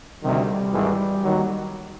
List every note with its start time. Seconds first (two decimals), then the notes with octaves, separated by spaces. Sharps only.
0.22 D2 C3 D#3 G3
0.73 G#1 G#2 E3
1.24 D#2 D#3 F#3